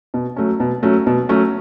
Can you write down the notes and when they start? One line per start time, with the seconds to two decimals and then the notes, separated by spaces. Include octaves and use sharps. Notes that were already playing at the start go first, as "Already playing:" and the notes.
0.14 B2
0.36 F#3 A3 C#4
0.60 B2
0.83 F#3 A3 C#4
1.07 B2
1.29 F#3 A3 C#4